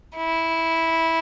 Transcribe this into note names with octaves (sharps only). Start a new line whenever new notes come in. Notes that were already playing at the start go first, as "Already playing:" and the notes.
E4